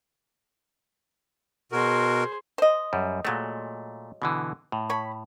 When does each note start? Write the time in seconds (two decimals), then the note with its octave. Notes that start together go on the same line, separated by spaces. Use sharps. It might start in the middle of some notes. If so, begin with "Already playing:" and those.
1.72 B2 F#4 G#4 A#4 C5
2.58 C5 D#5
2.93 F#2 G3
3.25 A#2 F#3 G#3 A3
4.22 B2 D3 E3
4.72 A2
4.90 C#5 B5